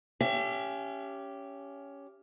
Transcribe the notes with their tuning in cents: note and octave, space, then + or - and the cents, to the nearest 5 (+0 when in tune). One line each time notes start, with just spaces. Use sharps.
C#4 +15 G4 +0 E5 +35